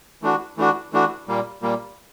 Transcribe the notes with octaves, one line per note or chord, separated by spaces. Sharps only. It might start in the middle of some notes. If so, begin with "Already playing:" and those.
E3 A3 D4 F#4
E3 A3 D4 F#4
E3 A3 D4 F#4
A#2 G3 A#3
A#2 G3 A#3